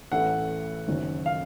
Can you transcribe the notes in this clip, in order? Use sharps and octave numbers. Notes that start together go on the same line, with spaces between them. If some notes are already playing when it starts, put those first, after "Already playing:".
A1 A2 E3 A3 F#5
F#1 F#2 D#3
F5